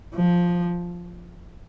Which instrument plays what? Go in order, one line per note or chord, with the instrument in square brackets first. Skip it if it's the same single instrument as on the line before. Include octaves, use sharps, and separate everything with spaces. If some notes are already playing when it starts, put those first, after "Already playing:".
[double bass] F3